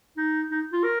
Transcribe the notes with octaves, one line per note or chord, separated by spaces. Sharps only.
D#4
D#4
F4
A#4